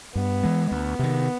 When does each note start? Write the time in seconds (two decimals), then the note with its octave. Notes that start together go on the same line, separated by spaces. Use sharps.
0.16 G2 B3
0.43 E3 G#3
0.71 D2 B3
0.99 C3 D#3